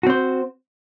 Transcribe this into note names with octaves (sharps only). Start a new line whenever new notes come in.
C4 F#4 C5